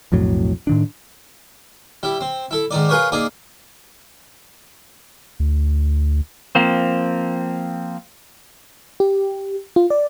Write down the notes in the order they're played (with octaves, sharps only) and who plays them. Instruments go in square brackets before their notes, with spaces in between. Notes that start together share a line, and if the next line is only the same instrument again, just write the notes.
[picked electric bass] B1 F2 A2 F#3
A2 D#3 D4
[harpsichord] G3 E4
C4
E4 A4
G#2 D#3 D#4 D5
F4 G#4 A#4 B4 C#5
A#3 D#4 G#4 D5
[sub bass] D2
[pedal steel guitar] F3 A#3 C4
[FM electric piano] G4
F4
D5